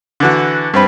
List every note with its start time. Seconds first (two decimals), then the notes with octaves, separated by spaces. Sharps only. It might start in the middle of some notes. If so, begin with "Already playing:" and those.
0.20 D3 E3 F#4
0.74 G2 C4 B4